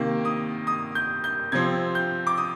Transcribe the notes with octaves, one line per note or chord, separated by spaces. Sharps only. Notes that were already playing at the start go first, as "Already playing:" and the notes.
Already playing: C3 D#3 A#3
D#6
D#6
G6
G6
C3 F3 C4 G#6
G6
D6
D#6